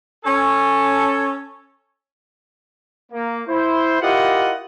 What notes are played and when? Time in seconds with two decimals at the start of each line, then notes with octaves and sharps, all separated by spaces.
0.25 C#4 A4
3.12 A#3
3.48 E4 C5
4.01 E4 F4 G4 A#4 D#5 F#5